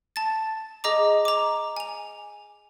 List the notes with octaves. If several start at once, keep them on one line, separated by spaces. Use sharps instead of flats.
A5 A6
G#4 D#5 A#5 D6
A#5 D6
G#5 F7